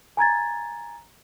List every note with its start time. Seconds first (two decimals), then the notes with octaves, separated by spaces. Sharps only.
0.17 G#5 A#5 G#6 A6